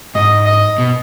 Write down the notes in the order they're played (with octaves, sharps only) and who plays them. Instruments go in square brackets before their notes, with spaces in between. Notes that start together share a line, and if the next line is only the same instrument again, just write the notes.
[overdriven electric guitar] G#2 [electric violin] D#5
[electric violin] D#5
[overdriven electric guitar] B2